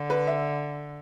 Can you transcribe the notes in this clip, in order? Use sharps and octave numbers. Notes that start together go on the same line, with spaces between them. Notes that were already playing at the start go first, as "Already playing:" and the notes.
Already playing: D3
B4
E5